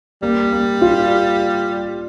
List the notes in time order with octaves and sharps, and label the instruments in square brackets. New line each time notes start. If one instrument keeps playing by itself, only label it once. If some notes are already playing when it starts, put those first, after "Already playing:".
[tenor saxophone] G3 [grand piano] A#3
[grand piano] A#3
F4